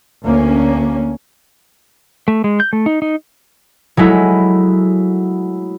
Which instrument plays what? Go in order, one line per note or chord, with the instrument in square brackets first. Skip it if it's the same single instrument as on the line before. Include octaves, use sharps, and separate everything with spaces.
[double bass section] D2 A#3 C#4
[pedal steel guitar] A3
G#3
G6
A3
D#4
D#4
[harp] F#3 G#3 A3 E4